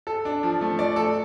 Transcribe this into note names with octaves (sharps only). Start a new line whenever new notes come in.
A4
D4
F3
A3
D5
A4